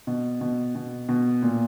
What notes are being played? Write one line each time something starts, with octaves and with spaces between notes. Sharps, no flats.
B2
B2
B2
B2
A#2